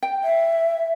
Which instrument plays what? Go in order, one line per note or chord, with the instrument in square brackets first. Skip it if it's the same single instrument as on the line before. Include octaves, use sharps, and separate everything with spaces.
[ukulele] G5
[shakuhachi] E5